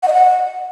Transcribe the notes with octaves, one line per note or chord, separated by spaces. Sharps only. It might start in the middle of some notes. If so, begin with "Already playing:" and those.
F#5
D#5
F#5